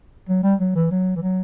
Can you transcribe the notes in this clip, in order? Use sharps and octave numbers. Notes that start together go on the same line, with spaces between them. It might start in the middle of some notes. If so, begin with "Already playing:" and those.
F#3
G3
F#3
E3
F#3
E3
F#3